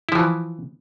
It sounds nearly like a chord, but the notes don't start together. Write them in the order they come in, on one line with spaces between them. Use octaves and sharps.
E4 F3 E3